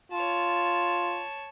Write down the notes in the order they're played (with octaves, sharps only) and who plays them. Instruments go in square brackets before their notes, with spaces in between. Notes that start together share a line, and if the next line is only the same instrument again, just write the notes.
[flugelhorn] F4 [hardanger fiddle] C#5 A5